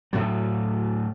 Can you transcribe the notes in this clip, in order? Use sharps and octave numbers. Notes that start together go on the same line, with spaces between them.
D2 A2 F#3